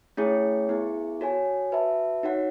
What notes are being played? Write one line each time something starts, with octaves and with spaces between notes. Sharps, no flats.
A3 C#4 E4 G#4 C#5
B3 E4 G#4
F#4 A4 C#5 G#5
F#4 B4 E5 A5
D#4 F#4 C#5 F#5